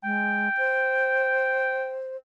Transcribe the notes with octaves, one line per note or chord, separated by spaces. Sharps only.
G#3 G5
C5